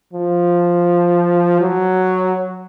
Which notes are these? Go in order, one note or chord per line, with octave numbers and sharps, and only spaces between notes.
F3
F#3